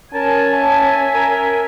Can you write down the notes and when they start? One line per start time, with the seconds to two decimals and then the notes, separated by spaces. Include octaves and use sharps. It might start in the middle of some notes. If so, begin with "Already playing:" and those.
0.14 C#4 A#4 G#5 A5
0.53 E5 A5
1.14 A#4